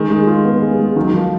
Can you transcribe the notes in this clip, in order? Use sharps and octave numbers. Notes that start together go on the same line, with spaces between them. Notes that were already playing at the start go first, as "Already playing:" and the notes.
Already playing: D#3 G#3
G#3
F4
B3
G#3
G#3
D#3 F#3
F3 F#3